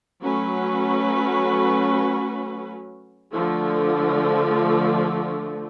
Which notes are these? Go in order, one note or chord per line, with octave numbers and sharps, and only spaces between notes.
F#3 A3 C#4 F#4 B4
D3 F3 A3